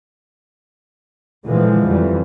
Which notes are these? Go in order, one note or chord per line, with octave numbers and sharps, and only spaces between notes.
A#2 D3 E3 F3 G#3
F2 E3 G3